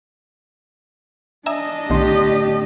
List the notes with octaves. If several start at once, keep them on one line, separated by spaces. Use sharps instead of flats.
D4 D#5 E5 G#5 A#5
B1 A2 D3 D#3 G4 C6